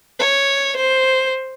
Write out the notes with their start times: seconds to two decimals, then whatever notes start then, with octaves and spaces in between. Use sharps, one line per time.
0.19 C#5
0.76 C5